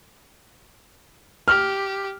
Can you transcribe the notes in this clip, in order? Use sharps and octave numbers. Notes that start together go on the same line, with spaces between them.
G4 F6